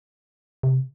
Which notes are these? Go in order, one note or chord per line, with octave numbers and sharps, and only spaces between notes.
C3